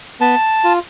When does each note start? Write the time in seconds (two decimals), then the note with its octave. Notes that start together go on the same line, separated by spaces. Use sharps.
0.20 B3 A5
0.64 F4